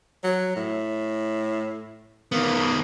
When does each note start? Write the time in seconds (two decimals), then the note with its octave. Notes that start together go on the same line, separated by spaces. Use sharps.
0.24 F#3
0.56 A2
2.32 D#3 A#3 B3